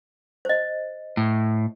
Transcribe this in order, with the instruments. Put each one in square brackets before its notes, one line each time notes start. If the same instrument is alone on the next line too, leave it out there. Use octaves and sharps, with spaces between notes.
[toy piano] C5 D#5
[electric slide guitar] A2